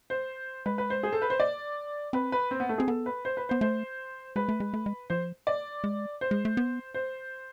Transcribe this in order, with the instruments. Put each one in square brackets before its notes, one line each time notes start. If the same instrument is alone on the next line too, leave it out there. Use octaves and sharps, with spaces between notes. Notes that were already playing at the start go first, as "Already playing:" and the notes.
[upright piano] C5
[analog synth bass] G#3 [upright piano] B4
[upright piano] B4
C5
G#4
A4
B4
C5
D5
[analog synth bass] C4 [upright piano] B4
[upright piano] B4
C4
B3
A3
[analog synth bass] C4 [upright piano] G#4
[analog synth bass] B3 [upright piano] A4
[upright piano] B4
C5
B4
[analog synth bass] B3 [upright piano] C5
[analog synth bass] A3 [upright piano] C5
[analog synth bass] G#3 [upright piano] B4
[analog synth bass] A3
G#3
A3
G#3
[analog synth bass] F3 [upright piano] C5
[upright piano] D5
[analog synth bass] G#3
[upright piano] C5
[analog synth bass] G#3
A3
B3
[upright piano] C5